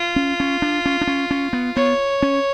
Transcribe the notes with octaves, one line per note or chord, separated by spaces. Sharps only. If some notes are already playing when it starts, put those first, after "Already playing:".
Already playing: F4
C#4
C#4
D4
C#4
D4
C#4
C#4
B3
B3 C#5
C#4